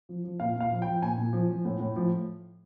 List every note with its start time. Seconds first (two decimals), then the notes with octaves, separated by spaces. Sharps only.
0.09 F3
0.24 F3
0.40 A#2 F5
0.56 A#2 F5
0.71 F3
0.82 F3 G5
1.02 A#2 G#5
1.18 A#2
1.33 F3
1.49 F3
1.65 A2
1.80 A2
1.96 F3